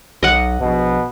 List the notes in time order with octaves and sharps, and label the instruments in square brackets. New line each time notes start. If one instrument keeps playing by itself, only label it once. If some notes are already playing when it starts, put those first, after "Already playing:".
[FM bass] B1 [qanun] D#5 F#5
[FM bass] A#1 [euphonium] B2